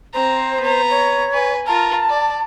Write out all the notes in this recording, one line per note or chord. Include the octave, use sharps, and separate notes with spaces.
C4 C5 A#5
B3 A#5
C#5
B4 G#5
F4 A#4 A5
D5